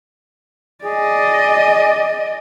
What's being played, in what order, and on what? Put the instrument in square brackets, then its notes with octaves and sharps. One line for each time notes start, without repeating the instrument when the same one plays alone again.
[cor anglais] G#4 [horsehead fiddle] D5 D#5